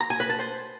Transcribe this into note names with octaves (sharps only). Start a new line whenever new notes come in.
A#5
G#5
B4
A5
C5